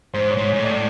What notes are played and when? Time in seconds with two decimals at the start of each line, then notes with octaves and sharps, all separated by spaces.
0.14 G#2 C5
0.31 C#5
0.37 G#2
0.48 C#5
0.54 G#2
0.59 A2
0.64 D5